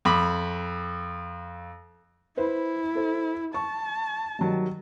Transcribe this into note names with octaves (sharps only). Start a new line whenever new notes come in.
F2 B5 D6
E4 B4 C5
A4 C5
A5 C#6
D#3 F#3 G3